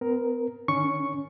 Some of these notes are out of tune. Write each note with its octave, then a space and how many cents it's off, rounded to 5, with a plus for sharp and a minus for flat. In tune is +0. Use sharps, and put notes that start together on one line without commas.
B3 +40 A#4 +5
D#3 -25 C#4 +15 C#6 +0